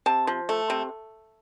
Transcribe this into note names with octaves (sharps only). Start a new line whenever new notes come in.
C3 A5
F3
A3
C3